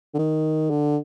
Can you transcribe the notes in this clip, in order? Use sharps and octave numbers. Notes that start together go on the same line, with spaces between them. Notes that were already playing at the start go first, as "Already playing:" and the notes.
D3
D#3
D3